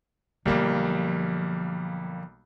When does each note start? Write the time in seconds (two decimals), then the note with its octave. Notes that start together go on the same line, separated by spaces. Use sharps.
0.45 B1 D3 F3 G3 A#3